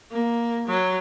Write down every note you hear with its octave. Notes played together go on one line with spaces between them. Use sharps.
A#3
F#3